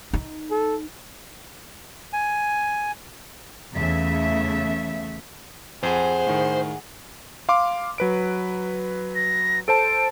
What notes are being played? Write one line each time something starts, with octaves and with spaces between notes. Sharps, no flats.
D#4
A4
G#5
E2 C#3 A3 E5
F2 G#4 C5 F#5 G#5
A2 D#3
F5 C6 D6
F#3 B4 D7
A#6
A4 C5 A5 D7